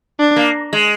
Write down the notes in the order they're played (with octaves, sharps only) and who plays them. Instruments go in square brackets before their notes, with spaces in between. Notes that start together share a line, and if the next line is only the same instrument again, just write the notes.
[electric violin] D4
[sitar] A#3
G#3